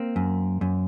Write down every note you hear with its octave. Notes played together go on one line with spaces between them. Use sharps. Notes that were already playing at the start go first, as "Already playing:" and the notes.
Already playing: A#3 C4
F#2
F#2